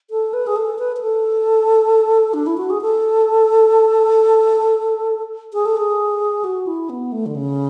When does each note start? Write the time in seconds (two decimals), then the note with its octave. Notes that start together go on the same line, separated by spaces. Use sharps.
0.10 A4
0.33 B4
0.47 G#4
0.56 A4
0.79 B4
0.96 B4
1.01 A4
2.34 D4
2.46 E4
2.57 F#4
2.70 G#4
2.81 A4
5.53 G#4
5.65 A4
5.77 G#4
6.44 F#4
6.67 E4
6.89 B3
7.12 A3
7.26 D3
7.35 C#3